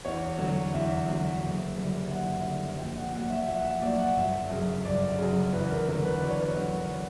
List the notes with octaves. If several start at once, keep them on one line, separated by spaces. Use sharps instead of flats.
E2 C#5
D3 F#3
E2 E5
D3 F#3
F#1
F#2 D3 G3
F#1 F#5
F#2 D3 G3
A#1 G5
F#5
A#2 F#3 F#5
E5
A#1 E5
F#5
E5
A#2 F#3 D5
F#5
G1 E5
F#2 C#3
G1 D5
F#2 C#3
E2 B4
A#4
D3 F#3 A#4
B4
E2 D5
C#5
B4
C#5
D3 F#3